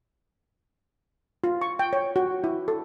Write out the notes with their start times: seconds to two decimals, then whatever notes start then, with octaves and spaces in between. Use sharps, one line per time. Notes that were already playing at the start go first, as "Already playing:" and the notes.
1.44 F4
1.61 C#6
1.79 G5
1.93 C#5
2.16 F#4
2.44 E4
2.68 A4